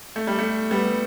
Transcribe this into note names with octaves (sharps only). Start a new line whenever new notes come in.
A3
G3
A3
G3 B3